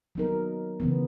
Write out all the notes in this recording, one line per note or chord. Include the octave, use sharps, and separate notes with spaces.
F#3 B3 D#4 A#4
C#3 E3 B3